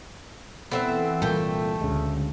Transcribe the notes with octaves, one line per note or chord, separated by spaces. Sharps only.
E3 B3 C4 A4 E5
C2 A#2 A3 A#3 G5
D2 C#3 G#3